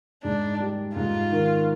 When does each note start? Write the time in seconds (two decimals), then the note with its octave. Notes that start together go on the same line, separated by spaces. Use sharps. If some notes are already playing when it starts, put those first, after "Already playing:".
0.24 G#2 D4
0.60 G3
0.95 G#2 F4
1.32 D#3